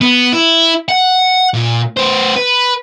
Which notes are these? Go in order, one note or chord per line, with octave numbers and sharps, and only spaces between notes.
B3
E4
F#5
A#2
B3 C5
B4